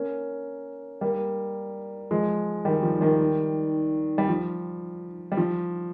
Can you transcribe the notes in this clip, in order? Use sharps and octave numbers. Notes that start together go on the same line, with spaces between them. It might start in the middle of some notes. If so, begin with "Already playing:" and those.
Already playing: A#3 C#4
G3 A#3
F3 G#3
D#3 G3
F3
D#3 G3
G3
F3
G3
F3